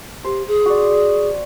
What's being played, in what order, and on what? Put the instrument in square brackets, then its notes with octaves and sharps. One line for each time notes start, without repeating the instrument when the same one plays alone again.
[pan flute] G4 [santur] C5
[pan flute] G#4
[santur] F#4 D5